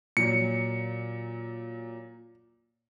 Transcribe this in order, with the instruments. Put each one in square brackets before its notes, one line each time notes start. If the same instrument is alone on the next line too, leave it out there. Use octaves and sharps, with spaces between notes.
[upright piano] A#2 F#3 [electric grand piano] C#7